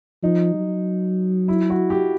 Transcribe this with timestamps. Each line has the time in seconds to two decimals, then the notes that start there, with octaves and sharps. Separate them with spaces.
0.23 F3 D#4
0.54 F#3
1.48 E4
1.70 F#4
1.90 G4